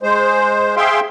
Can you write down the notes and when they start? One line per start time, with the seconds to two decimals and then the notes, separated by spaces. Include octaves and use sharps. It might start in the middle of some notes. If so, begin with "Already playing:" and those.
0.03 G#3 C5
0.77 G#4 E5 F5 G5 C6